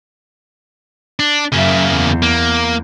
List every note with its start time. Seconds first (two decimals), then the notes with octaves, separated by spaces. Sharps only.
1.20 D4
1.52 F#2 C#3 A#3 E5
1.90 E2
2.22 A#3